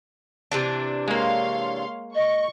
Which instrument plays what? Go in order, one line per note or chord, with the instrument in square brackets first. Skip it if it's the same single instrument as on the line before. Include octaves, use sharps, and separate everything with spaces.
[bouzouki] C3 E3 D4
[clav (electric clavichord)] G#3 A#3 [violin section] C#5 F5 C6
[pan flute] D#5 [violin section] C#6